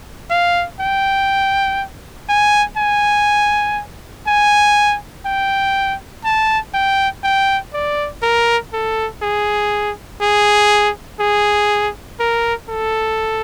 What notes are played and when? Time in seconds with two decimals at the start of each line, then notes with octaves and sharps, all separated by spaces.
0.30 F5
0.80 G5
2.29 G#5
2.77 G#5
4.27 G#5
5.26 G5
6.24 A5
6.74 G5
7.24 G5
7.74 D5
8.22 A#4
8.73 A4
9.22 G#4
10.21 G#4
11.20 G#4
12.20 A#4
12.69 A4